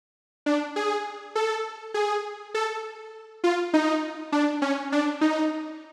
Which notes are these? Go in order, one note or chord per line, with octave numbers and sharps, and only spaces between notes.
D4
G#4
A4
G#4
A4
F4
D#4
D4
C#4
D4
D#4